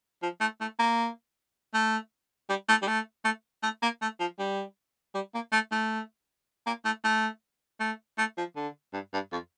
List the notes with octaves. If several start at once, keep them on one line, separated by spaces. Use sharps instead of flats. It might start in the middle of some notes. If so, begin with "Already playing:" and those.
F3
A3
A3
A#3
A3
G3
A3
G3
A3
A3
A3
A#3
A3
F3
G3
G3
A#3
A3
A3
A#3
A3
A3
A3
A3
F3
D3
G2
G2
F2